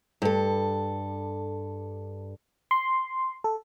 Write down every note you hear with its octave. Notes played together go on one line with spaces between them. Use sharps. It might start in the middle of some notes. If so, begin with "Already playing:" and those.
G2 A4
C6
A4